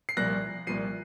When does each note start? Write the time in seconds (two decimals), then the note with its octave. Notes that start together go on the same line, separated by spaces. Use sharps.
0.09 C7
0.17 C2 A#2 F3 F#6 A#6
0.67 C2 A#2 F3 C7 D#7